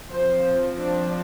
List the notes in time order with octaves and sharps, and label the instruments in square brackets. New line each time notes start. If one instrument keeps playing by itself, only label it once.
[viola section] F3 C4 C5
D4